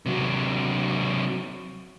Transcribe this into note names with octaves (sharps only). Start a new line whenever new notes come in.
C3 F#3